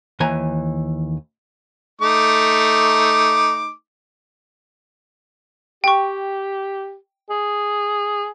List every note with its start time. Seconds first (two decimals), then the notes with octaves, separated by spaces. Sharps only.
0.20 D#2 E3 G#5 A#5
2.01 A3 D#4 D6
5.84 G4 G5 C#6
7.30 G#4